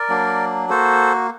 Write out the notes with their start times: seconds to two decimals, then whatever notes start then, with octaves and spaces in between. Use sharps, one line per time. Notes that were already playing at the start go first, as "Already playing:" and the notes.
Already playing: A#4 D5
0.09 F#3 A#3 D4
0.69 A#3 F#4 A4 C5